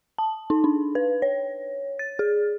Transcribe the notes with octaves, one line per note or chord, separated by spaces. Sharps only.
A5
D#4
D4
B4
C#5
A6
G#4